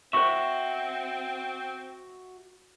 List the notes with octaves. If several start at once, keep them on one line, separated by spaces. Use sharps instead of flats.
C4 F#4 C5 E5 C#6